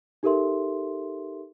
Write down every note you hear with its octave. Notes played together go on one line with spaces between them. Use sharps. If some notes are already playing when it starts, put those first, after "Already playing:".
D#4 G4 A4 A#4 E5 C6